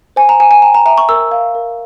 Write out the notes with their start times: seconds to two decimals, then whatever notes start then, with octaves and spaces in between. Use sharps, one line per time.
0.16 C5 G#5
0.29 A#5
0.40 C5 G#5
0.51 G#5
0.62 G5 A#5
0.75 A#5
0.86 E5 A#5
0.98 C#6
1.09 A#4 E6
1.31 F5
1.55 A#4